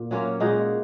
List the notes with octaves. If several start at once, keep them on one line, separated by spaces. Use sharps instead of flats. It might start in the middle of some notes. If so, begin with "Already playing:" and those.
Already playing: A#2
F#3 A#3 C#4 F4
A#2 G#3 D#4 F#4